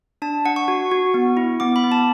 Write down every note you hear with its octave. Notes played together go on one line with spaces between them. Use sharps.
D4 A5
D4 F#5
C#6
F#4
F#4
B3
E4
B3 D6
B5
B3
A5